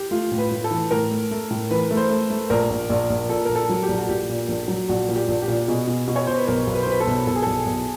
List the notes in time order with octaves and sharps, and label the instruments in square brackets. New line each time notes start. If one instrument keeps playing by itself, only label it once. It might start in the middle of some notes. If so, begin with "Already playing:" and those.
Already playing: [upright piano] G4
[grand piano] A3 [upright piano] F4
[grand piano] A2
[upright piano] B4
[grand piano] A2
[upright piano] A4
[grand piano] E3
[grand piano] A2 [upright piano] A#4
[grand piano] A3
A3
A2
[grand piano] E3 [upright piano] B4
[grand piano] A3
[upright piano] C5
[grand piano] A3
A3
[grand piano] A#1 [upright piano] A#4
[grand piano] A#1
A#1
A#1
[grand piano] A#2 [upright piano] A4
[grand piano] A#1 [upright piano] A#4
[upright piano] A4
[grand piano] F#3
[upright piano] G4
[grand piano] A#1
[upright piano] F#4
[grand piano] A#1 [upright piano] G4
[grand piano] A#2
A#1
F#3
[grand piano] A#1 [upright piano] F#4
[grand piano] A#2
[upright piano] G4
[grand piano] A#1
[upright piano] G4
[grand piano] A#2
[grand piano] B2 [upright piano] G#4
[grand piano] B2
B2
[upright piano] C#5
[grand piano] B2 [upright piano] C5
[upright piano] B4
[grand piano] B1 [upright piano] A#4
[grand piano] B1
[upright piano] B4
C5
[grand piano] B2 [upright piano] B4
[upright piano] A4
[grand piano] B1
[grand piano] B1 [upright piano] A4
[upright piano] G#4
[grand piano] B1 [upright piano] A4
[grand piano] B1